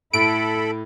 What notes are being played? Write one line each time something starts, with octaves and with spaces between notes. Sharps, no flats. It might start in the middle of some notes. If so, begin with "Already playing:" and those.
A2 E4 A4 B5 D7